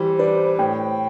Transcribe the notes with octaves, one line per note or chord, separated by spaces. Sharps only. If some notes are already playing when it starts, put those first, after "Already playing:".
Already playing: E3 G3 C5
D4 B4
A2 G5